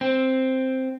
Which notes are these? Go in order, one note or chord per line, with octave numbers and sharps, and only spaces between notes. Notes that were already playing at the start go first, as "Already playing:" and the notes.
C4